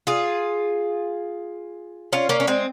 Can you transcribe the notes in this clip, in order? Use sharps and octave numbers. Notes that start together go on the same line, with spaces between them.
F4 G#4
C#4 F4
A#3 C#4
C#4
G#3 C4